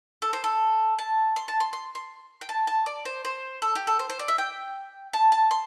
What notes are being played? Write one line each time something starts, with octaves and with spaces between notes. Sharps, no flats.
A4
C5
A4
A5
C6
A5
C6
C6
C6
G5
A5
A5
D5
C5
C5
A4
G4
A4
C5
C5
D5
E5
G5
A5
A5
C6